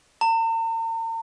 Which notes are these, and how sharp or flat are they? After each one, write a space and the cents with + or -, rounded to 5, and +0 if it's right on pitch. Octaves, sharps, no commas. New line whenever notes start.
A#5 -45